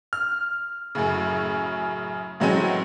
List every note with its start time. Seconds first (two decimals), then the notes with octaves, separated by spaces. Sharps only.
0.13 F6
0.95 F#2 A2 C#3
2.40 A2 E3 F#3 G#3 C4 C#4